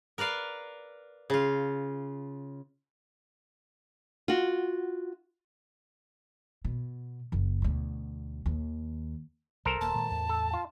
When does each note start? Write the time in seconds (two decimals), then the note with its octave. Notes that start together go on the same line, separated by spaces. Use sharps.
0.18 A#4 B4 D5 F5
1.30 C#3 F4
4.28 F4 F#4
6.65 B2
7.32 F#1 C#3
7.62 D2 B2
8.46 D#2
9.65 C2 G3 A4 A#4 C5
9.81 D#1 A#3 A5
9.94 A#2 D#3 G#3
10.11 E2 A2
10.29 A4
10.53 F4